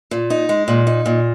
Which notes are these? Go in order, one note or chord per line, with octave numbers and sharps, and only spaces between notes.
A#2
D#4
G#3
A#2
D#4
A#2